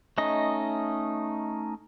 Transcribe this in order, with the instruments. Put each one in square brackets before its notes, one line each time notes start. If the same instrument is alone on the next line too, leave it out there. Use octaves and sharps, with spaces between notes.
[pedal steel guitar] A3 C#4 D#4 D#5